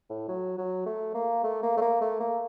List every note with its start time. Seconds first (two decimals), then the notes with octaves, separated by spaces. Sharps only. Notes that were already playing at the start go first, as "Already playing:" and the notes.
0.10 A2
0.28 F#3
0.58 F#3
0.86 A3
1.14 A#3
1.44 A3
1.63 A#3
1.77 A3
1.81 A#3
2.01 A3
2.20 A#3